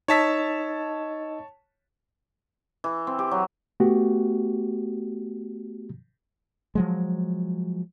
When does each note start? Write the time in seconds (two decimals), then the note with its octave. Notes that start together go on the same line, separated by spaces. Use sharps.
0.08 D#4 C#5 D#5 A5 E6 B6
2.84 E3
3.07 C4
3.19 G4
3.31 F#3
3.80 A3 B3 F#4 G4
6.75 F3 F#3 G#3